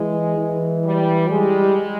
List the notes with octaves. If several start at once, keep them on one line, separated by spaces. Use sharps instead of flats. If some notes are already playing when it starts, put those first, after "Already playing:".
Already playing: E3 G#3
E3
G3
G3 G#3